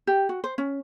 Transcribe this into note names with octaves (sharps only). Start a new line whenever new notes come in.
G4
F#4
C5
C#4